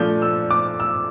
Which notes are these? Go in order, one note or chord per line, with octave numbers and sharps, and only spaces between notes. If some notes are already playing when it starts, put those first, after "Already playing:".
Already playing: A#2 F3 A3 D4 G6
E6
D6
E6